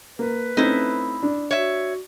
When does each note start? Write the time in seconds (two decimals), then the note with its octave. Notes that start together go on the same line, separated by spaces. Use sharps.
0.19 A#3 B4
0.57 A3 C4 C#4 D#4 E4
1.23 D4
1.51 F#4 C#5 E5